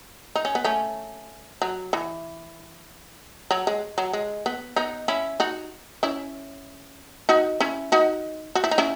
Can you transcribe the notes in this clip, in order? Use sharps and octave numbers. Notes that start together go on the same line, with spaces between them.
D#4
C#4
B3
A3 C#4
F#3
E3
F#3
G#3
F#3
G#3
B3
B3 D#4
C#4 E4
D#4 F#4
C#4 E4
D#4 F#4
C#4 E4
D#4 F#4
F#4
E4
D#4
C#4 E4